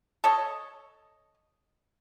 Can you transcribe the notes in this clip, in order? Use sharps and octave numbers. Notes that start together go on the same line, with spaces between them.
A4 C#5 D#5